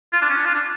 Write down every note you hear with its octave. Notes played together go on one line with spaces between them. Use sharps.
F4
D4
C#4
D4
F4
D4